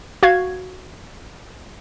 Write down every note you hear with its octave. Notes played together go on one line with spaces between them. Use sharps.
F#4 F5 G#6